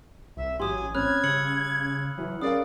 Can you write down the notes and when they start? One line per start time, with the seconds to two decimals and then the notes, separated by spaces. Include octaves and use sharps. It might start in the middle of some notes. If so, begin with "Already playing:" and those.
0.37 C2 E5
0.60 A1 F#3 G4 G#5 C6 D#6
0.95 C4 C#4 B5 F6 F#6 G#6
1.24 C#3 G3 E6 C#7 F#7
2.18 E3 F#3
2.42 C#4 G#4 A#4 D5 F5 D#6